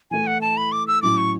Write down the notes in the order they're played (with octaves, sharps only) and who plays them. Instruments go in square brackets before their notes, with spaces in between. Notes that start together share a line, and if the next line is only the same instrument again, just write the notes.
[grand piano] E3 A3 E4 [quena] G#5
[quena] F#5
A5
B5
D6
E6
[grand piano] A2 F#3 C#4 E4 [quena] D6
[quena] C#6